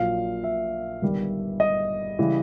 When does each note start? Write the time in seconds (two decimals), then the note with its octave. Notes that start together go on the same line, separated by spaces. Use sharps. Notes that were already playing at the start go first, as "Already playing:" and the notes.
Already playing: A#1 A#2 F#3 F5
0.44 E5
1.02 G1 G2 D#3 G3
1.60 D#5
2.19 C#3 E3 G3